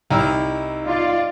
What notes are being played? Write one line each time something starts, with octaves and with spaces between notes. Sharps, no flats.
C2 D#4 E4
F4 D5